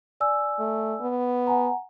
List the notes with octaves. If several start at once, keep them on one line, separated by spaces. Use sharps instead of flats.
D5 G#5 E6
A3
B3
F#5 G#5 A#5